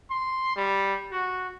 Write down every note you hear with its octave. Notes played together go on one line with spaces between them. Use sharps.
C6
G3
F#4